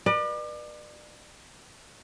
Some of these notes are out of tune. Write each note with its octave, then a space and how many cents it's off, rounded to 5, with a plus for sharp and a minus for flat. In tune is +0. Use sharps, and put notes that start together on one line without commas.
B4 -30 D5 +35